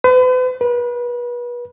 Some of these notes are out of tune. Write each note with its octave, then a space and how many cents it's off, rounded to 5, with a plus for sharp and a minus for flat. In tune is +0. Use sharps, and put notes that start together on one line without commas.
B4 +45
B4 -30